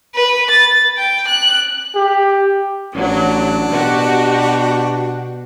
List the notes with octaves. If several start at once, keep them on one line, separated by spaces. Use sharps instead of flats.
B4
A6
G5
F#6
G4
A1 F#3 D4
B2 F#4 G4